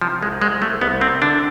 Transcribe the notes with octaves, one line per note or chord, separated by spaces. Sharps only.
C3 F3
C2 G#3
C2 G#3
C2 A3
C2 B3
C3 C4
D3 D4